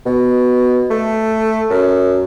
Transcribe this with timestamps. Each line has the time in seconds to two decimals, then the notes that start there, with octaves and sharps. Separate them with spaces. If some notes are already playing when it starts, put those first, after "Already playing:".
0.06 B2
0.90 A3
1.70 F#2